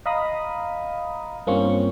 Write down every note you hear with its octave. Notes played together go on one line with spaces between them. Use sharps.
D#5 F5 A#5 B5 D#6
G2 A#3 C4 C#4 F4 C#6